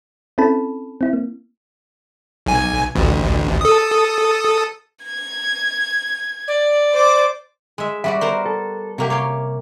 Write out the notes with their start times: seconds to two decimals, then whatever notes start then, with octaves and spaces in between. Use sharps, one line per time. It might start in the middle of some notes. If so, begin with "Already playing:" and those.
0.38 C4 C#4 E4 A4 A5 B5
1.01 C4 E4
1.13 A#3
2.46 B1 G#5
2.95 A1 D2
3.61 A4 D#6
5.04 G#6
6.48 D5
6.92 C5 D6
7.78 G#3 E5
8.04 G3 F#4 D5 E5
8.21 B3 A#4 C5
8.46 A4
8.98 C2 C3 F#3 A#3 G4
9.10 C#5 F5 G5